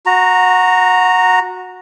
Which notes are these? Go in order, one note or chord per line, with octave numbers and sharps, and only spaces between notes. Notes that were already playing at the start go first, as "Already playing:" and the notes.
F#4 A#5